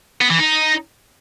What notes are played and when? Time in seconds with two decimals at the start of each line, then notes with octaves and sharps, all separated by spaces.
0.21 B3
0.30 E3
0.39 D#4